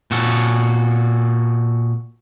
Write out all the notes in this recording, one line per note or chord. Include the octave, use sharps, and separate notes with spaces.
A#2 F#4 A4